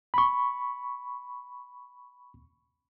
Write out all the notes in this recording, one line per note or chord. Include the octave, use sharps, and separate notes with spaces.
B5 C#6